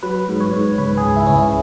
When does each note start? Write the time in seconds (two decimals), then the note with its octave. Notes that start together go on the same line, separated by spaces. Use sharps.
0.03 F#3 B4
0.28 G#2
0.41 C#5
0.53 G#2
0.78 C#2 B4
0.98 G#4
1.04 C#2
1.16 E4
1.27 C#2 C#4
1.35 E4